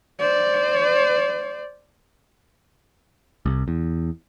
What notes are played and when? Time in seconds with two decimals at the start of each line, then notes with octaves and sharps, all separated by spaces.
0.19 C5 D5
3.46 C2
3.68 E2